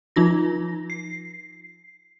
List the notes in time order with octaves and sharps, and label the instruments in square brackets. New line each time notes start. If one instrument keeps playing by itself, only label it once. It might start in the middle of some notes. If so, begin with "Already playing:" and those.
[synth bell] F3 D#4 F4 A#6
C7